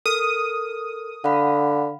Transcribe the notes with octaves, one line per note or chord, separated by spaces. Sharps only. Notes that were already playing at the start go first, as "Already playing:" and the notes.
A4 A#4 D#6 F6
D3 F5 F#5 B5